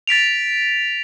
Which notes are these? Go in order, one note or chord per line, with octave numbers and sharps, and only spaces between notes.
A6 B6 D7 F7